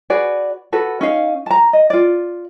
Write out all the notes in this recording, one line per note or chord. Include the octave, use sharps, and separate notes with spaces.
F#4 G#4 B4 D5
F#4 A4 B4
C#4 D#4 F5
A5 A#5
D#5
F4 D5